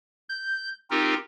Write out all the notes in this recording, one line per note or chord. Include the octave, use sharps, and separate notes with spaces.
G6
C4 D#4 F4 G4 A#4